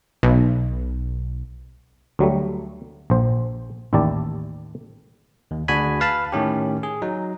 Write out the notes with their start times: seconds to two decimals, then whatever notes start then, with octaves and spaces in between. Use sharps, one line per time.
0.23 B1
2.19 D2 F#3 G3 A3
3.10 A#1 C5
3.93 A1 D#2 E4 G4 D5 A5
5.51 D#2
5.68 D2 D4 F#4 G#4 G#5 B5
6.00 B4 F5 A5 B5
6.32 A2 D#3 C#4 G4
6.83 G#4
7.02 F#3 D#4